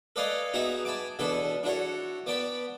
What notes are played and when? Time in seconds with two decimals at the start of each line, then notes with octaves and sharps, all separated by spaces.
0.16 A4 B4 D5 D#5 F5 G#5
0.54 B3 D#4 F#4 G#4 E5
0.85 G#5 A5 B5 D6
1.19 E2 B2 D4 A4 A5 B5
1.63 D4 E4 F#4 A4 C#5
2.26 B3 D5 G5 A5 B5